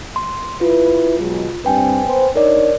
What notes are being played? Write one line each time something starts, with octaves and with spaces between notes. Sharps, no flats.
C6
E4 F4 B4
B2 F#3 G#3
G2 C4 B4 G5 G#5
B3 C5
D4 D#4 A#4 C#5 D5